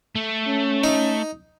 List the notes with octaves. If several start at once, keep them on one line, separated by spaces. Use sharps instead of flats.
A3
C#4
D#4